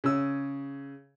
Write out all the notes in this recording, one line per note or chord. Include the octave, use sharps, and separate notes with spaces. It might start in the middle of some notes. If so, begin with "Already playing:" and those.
C#3 C#4 E6